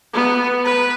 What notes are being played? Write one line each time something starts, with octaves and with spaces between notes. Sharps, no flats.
B3
B4